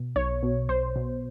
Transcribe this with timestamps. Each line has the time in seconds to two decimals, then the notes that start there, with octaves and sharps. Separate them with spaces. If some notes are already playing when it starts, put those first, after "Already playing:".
Already playing: B2
0.16 B1 C#5
0.43 B2
0.69 B1 C5
0.96 B2